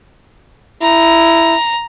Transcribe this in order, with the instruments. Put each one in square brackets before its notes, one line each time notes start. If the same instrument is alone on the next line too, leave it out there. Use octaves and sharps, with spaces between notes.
[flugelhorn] E4 [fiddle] A#5